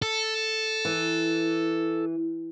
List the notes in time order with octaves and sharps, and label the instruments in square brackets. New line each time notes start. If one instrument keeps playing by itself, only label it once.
[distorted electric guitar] A4
[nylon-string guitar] E3